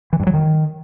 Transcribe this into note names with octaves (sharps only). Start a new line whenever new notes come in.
E3
G2
F#3
D#3